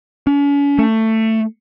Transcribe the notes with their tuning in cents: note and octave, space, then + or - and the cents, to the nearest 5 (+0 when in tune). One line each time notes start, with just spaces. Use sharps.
C#4 +40
A3 +15